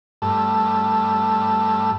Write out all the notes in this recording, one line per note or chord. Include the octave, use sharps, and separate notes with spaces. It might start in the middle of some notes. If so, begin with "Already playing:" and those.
G2 A3